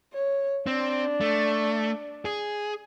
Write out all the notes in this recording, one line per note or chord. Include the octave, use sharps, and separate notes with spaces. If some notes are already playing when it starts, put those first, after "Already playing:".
C#5
C4 D4
A3
G#4